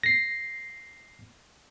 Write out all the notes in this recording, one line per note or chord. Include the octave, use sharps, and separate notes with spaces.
A#6 C7